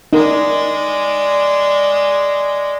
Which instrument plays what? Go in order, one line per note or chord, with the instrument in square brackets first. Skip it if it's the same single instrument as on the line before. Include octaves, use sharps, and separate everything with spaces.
[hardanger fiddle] G#3 D5 [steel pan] D#4 A#4